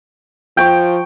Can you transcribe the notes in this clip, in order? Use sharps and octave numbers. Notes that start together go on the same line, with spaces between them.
F3 G5 C#6